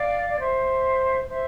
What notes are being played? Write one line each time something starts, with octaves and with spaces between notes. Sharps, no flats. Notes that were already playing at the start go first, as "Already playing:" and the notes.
Already playing: D5 F5
D5
C5 E5
C5 E5